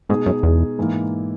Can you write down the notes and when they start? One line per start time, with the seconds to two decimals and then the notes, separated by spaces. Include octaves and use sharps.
0.09 G#2 B2 G#3 D#4 G#4
0.26 F#2
0.43 E2
0.78 G#2 E3 A#3